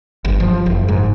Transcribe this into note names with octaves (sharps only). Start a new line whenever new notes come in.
G1
F3
F#1
G#2